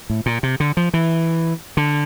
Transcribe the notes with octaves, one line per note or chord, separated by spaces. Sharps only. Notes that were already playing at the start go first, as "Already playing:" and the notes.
A2
A#2
C3
D3
F3
E3
D3